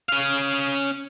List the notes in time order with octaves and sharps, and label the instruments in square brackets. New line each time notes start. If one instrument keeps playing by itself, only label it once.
[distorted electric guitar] C#4 F5